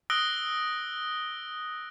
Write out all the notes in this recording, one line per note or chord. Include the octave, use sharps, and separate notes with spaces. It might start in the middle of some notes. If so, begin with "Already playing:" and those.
D#6 E6 F#6 A#6 D7 G7